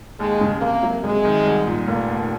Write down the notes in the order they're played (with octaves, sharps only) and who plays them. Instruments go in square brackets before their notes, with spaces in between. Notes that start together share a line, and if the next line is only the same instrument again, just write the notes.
[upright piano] D#2 [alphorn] G#3
[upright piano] C#3
[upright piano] C3 [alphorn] A#3
[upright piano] F#3
[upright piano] C3 [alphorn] G#3
[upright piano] D#3
C2
A#2
[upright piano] F1 [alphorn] A#3
[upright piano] D#2